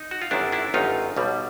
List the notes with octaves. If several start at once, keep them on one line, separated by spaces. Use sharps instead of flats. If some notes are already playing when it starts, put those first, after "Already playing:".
Already playing: D#4
F#4
F4
G1 F#2 D#3 D4 E4
D4 E4
G1 F#2 D#3 D#4 F4
B1 B2 G3